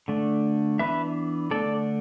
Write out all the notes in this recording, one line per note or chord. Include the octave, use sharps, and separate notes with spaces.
D3 A3 D4
E3 B3 D4 B4 E5
D3 A3 D4 A4 D5